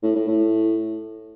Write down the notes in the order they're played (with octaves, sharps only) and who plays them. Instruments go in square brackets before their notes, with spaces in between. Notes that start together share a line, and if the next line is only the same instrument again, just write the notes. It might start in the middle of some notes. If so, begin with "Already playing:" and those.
[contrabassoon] A2
A2
A2